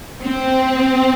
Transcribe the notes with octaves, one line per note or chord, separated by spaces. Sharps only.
C4